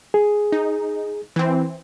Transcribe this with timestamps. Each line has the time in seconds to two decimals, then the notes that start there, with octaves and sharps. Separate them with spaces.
0.14 G#4
0.52 D#4
1.36 E3 C4